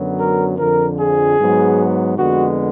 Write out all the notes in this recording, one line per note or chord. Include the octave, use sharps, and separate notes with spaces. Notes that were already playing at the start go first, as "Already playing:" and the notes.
Already playing: F#2 D3 F#3 B3
A#4
F2 D3 F3 A#4
G#4
G#2 F#3 B3
F2 D3 G#3 B3 F#4